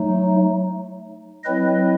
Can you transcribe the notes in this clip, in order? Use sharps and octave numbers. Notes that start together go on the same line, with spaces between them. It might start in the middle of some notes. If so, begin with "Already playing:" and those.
Already playing: F#3 A3 D#4
F#3 C4 E4 B4 D#5